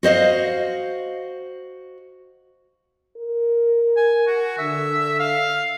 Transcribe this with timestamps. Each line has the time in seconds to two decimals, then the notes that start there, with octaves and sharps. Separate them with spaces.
0.03 F#4 C5 D#5 F5
3.17 A#4
3.97 G#5
4.27 F#4
4.58 D3 E5
5.19 F5